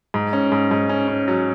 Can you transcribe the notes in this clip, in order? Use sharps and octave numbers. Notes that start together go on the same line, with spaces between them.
G#2
C#4
G#2
G#2
C#4
C#4
F#3